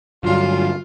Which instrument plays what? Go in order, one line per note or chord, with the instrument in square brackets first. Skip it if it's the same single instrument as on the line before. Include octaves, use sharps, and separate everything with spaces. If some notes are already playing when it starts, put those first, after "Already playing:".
[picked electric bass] G2 D3 F#3 [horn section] F4